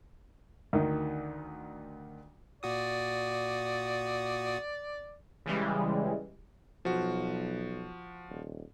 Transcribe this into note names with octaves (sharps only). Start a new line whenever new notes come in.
D2 D#3
A#2 F#4 D5 D#6
C#3 E3 G3 G#3
B1 F3 F#4
D#1